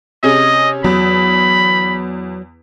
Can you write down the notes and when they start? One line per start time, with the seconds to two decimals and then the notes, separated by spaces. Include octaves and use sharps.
0.23 C3 C#4 G#4 D#5
0.84 E2 F#3 B5